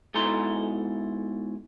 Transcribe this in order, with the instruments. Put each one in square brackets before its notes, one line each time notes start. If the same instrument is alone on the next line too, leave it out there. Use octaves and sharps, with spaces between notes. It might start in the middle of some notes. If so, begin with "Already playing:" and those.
[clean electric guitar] G#2 B2 E4 A4 A#5 C6